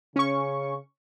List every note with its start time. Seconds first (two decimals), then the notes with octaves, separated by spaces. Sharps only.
0.16 C#3 C#4 C#6